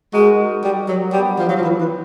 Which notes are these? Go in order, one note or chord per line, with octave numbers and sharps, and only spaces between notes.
G#3 D#4 F#4 A#4
G3
F#3
G3 B3 D4 G4
F3
F#3
F3
E3
E3